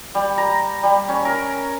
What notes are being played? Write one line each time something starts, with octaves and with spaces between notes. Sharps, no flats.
G3
A#5
G3
C#4
A#4